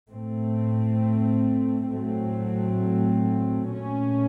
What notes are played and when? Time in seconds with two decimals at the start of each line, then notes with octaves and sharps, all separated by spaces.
0.10 A2 A3 C4
1.91 A2 F#3 A3 C4
3.71 A#2 A3 C#4